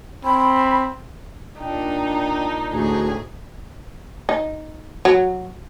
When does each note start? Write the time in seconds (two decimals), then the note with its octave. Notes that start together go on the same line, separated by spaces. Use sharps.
0.25 C4 B5
1.60 A#2 D4 D#4 G5
2.73 D2 A2 F#4 G#4
4.29 D#4
5.05 F#3